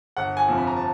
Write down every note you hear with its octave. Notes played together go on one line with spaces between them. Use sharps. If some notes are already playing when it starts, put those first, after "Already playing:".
G1 F#5
G#5
F2 C3 F3
B5
A#5
A5